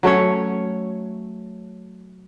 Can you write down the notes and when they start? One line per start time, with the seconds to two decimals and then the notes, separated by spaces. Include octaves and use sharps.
0.03 F#3 A3 C#4 C#5